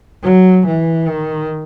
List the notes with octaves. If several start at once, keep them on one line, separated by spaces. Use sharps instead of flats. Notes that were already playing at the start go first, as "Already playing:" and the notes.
F#3
E3
D#3